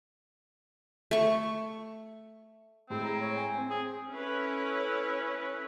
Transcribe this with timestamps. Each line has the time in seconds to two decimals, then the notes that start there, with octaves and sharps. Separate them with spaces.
1.11 A3 C#6
2.90 A2 G#3 C4
3.03 A#5
3.20 C#5
3.36 G#5
3.58 C4
3.70 G#4
4.10 C#4 E4 A4 B4